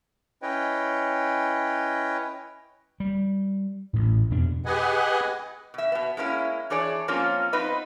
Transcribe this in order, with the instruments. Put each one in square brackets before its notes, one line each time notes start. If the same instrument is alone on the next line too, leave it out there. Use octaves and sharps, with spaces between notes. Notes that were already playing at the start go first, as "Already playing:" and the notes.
[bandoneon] C#4 E4 B4 C#5 D#5 G5
[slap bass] G3
A1 A2
F2 B2 D4
[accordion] G4 G#4 B4 D#5 F#5 G#5
[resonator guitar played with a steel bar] B2 E5
B2 B3
G#3 A#3 C#4 E4
E3 D4 G#4 C#5 D5
F3 A#3 C4 C#4 F4
B3 C4 D#4 B4 D#5